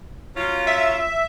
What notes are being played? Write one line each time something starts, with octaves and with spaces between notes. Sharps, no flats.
F#3 C#4 F4
E5